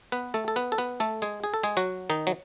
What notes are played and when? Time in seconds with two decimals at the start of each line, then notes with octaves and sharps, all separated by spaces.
0.12 B3 B4
0.34 A3 A4
0.48 A4
0.56 B3 B4
0.72 A4
0.78 B3 B4
1.00 A3 A4
1.22 G#3 G#4
1.44 G#4
1.54 A4
1.63 G#3 G#4
1.77 F#3 F#4
2.10 D#3 D#4
2.27 F#3